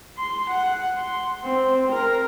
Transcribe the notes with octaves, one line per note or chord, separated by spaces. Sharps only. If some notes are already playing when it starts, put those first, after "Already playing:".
C6
F#5
C6
C4
A#4